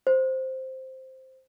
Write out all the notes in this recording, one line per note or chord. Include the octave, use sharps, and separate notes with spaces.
C5